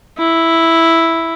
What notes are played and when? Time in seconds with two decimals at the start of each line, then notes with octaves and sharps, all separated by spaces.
0.18 E4